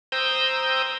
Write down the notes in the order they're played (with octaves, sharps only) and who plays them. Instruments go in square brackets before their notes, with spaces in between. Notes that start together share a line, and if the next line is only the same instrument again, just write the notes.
[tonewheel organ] C5 G5 A#5 D#6 E6 G6